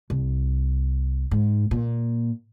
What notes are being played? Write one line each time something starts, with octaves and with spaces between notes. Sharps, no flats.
C2
G#2
A#2